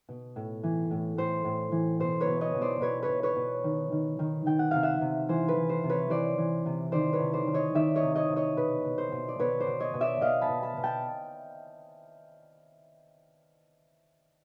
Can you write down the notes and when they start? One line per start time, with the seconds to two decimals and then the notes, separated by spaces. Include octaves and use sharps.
0.09 B2
0.36 A2
0.63 E3
0.91 A2
1.17 A2 C5
1.45 A2
1.72 E3
2.00 B2 C5
2.20 B4 C#5
2.27 B2
2.41 C#5 D#5
2.55 B2
2.61 C5 D5
2.80 B2 B4 C#5
3.03 B4 C#5
3.09 B2
3.23 B4 C#5
3.37 B2
3.64 D#3
3.92 D#3
4.19 D#3
4.46 D#3 G5
4.59 F#5
4.71 C3 F5
4.83 E5 F#5
5.01 C3
5.28 E3 C5
5.48 B4
5.56 E3
5.69 C5
5.84 C3
5.89 B4 C#5
6.10 E3 C5 D5
6.38 E3
6.66 C3
6.92 D#3 C5 D5
7.13 B4 C#5
7.20 C3
7.33 C5 D5
7.47 D#3
7.54 C#5 D#5
7.75 D#3 D5 E5
7.95 C#5 D#5
8.03 C3
8.15 C#5 D#5
8.29 C3
8.36 C#5 D#5
8.57 B2 B4
8.85 B2
8.98 C5
9.12 B2
9.28 D5
9.39 B2 B4 C#5
9.60 C5 D5
9.67 B2
9.80 C#5 D#5
9.94 B2
10.01 D5 E5
10.21 B2 D#5 F5
10.41 A5 B5
10.49 B2
10.62 A5 B5
10.77 B2
10.84 G5 A5